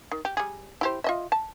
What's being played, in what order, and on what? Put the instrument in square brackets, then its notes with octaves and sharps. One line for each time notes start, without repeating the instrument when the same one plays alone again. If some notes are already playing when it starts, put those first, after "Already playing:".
[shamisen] D#3
G4
G3 G#4
E4 G4 C5
F4 D#5 E5
A5